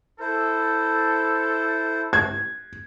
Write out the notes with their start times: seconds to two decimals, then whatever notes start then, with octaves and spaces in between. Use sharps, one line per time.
0.20 E4 A4 C5
2.13 G#6